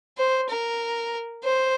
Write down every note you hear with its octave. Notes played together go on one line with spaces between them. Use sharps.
C5
A#4
C5